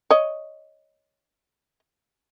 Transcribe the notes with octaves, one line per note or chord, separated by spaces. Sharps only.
C#5 D#5